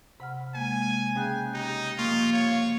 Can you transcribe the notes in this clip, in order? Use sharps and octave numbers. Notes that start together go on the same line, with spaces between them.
C3 F#5 B5 F6
G#3 A#3 G5 G#5
C#3 G5 F#6 G6
D#4 G4
F3 A#3 F4 C#6
C#5 F5